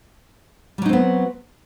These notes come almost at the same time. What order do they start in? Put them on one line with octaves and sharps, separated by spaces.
G3 F#3 D#4 C4 B3